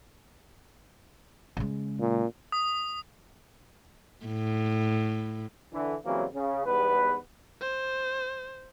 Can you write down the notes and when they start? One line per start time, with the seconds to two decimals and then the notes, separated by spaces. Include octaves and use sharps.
1.57 C#3 G#3
2.00 A#2
2.52 D#6
4.26 A2
5.73 D3 E3
6.06 C#3 E3 F#3 G3 A#3 C4
6.35 C#3
6.66 E2 G#2 G3 B3 B4
7.61 C5